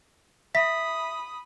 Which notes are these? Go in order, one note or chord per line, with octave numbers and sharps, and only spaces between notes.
E5 B5 D#6 B6